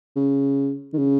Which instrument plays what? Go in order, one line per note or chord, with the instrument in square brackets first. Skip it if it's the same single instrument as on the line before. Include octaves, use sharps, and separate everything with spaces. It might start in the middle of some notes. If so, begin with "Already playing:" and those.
[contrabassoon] C#3
D#3
C#3